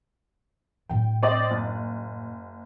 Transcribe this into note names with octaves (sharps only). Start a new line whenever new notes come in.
A2 F#3 G5
C4 D5 D#5
F#1